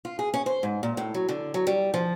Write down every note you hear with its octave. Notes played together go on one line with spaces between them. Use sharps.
F4
G#4
C#4
C5
G#2
A#2
A2
F#3
D3
F#3
G3
F3